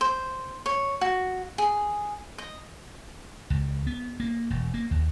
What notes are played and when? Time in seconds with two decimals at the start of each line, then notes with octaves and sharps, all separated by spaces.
0.01 C5
0.66 C#5
1.01 F#4
1.58 G#4
2.38 D#5
3.50 C#2
3.87 B3
4.20 A#3
4.50 E1
4.74 A#3
4.91 D#2